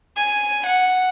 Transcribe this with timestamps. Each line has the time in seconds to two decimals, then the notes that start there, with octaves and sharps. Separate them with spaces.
0.16 G#5
0.66 F#5